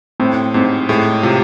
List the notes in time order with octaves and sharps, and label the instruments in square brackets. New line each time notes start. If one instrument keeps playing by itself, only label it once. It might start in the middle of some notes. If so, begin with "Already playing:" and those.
[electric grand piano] A2 [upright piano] C4
[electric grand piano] G#2 [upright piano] C4
[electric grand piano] A2 [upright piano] G#3
[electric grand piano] C3 [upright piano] F4